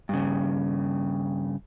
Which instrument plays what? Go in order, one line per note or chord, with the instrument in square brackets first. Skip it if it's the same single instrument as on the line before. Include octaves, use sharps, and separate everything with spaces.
[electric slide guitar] G2 C#3